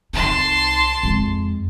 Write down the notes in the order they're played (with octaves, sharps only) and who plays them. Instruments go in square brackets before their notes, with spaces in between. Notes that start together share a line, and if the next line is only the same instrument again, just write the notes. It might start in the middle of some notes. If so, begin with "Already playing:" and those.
[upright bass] C2 D#4 [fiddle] A5 C6
[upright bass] F2 G#3